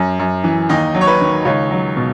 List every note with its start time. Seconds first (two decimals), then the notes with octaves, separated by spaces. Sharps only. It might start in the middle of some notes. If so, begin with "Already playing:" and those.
Already playing: F#2
0.19 F#2
0.44 E3
0.69 D#2 D#4 D#5
0.94 F#3
1.01 C#5
1.07 B4
1.21 D#3
1.45 C#2 C#5
1.71 F#3
1.97 B2